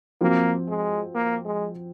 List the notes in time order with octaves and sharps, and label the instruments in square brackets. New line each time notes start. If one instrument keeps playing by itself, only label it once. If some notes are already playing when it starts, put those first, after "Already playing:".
[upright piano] F3 C4 F#4 [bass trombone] A#3
[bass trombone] G#3
A#3
G#3